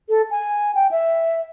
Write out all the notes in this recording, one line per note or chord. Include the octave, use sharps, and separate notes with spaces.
A4
G#5
G5
E5